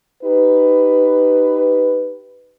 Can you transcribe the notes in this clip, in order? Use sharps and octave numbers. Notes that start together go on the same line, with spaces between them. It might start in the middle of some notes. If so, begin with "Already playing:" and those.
D#4 G4 B4